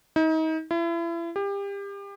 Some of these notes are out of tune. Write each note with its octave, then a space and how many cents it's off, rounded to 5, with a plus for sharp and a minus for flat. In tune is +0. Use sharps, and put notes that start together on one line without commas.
D#4 +35
E4 +35
G4 +30